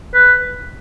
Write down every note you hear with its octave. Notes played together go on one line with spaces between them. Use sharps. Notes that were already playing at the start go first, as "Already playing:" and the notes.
B4